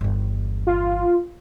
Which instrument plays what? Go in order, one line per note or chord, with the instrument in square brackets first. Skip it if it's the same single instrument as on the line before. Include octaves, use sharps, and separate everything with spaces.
[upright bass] G1 E2
[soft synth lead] F4